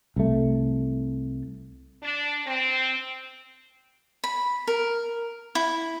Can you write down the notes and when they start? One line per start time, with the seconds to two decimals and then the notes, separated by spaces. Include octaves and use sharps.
0.16 C2 A3
2.03 D4
2.47 C4
4.24 B5
4.67 A#4
5.55 E4